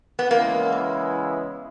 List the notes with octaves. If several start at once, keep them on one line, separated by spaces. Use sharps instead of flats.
B3
C#3 E3 G#3 A#3 B3 E4